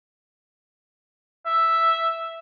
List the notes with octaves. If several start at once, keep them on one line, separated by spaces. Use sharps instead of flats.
E5